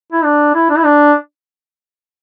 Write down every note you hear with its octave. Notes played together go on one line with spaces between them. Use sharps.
E4
D4
E4
D4
E4
D4